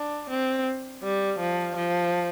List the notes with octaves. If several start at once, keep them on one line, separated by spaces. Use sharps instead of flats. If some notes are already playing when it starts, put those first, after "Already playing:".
Already playing: D4
C4
G3
F3
F3